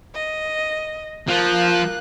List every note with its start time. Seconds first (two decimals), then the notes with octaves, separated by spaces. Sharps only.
0.15 D#5
1.28 F3 A#3 F#6